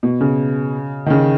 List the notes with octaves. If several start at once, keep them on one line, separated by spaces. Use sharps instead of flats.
B2
C#3
D#3
C#3